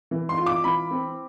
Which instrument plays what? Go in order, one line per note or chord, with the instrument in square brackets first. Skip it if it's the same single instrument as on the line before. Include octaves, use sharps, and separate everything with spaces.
[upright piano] E3
C6
F4
D6
E3 B5
C4